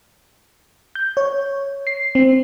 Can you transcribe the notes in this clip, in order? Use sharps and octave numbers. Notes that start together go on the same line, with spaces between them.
G6
C#5
C7
C4